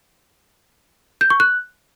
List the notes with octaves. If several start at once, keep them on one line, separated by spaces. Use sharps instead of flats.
G6
C#6
F#6